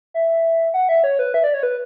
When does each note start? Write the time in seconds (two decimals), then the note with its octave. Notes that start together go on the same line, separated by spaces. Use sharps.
0.14 E5
0.74 F#5
0.89 E5
1.04 C#5
1.19 B4
1.34 E5
1.44 D5
1.54 C#5
1.63 B4